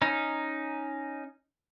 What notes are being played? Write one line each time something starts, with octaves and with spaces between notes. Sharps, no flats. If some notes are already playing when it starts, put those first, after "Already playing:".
C#4 D#4